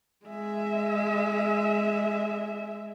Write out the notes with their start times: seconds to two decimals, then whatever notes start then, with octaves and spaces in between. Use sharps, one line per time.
0.26 G#3 E5